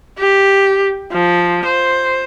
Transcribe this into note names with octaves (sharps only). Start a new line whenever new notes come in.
G4
F3
C5